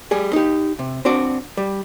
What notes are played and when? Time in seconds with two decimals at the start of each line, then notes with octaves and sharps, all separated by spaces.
0.11 G3 G#4
0.33 D#4 G4
0.79 C3
1.05 C4 D4 F#4 D5
1.57 G3